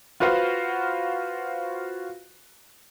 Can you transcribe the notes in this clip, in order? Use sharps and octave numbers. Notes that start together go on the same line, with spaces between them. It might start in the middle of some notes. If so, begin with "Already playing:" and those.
F4 F#4 B4 C5 F5 F#5